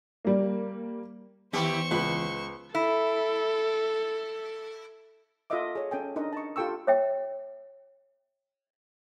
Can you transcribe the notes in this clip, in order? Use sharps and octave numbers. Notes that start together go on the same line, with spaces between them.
G3 A#3
E2 D#3 B3 G4 C5 C#6
C#2 B4
E4 A4
F4 A4 A#4 D#5 E5 D6
G#4 C#5
C#4 A4 G5 G#5
D4 D#4 A#4 D#5
A5 C#6
F4 G4 A4 G5 C#6 E6
C#5 E5 G5